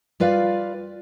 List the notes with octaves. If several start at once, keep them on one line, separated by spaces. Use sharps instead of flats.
G3 F4 B4 D5 F5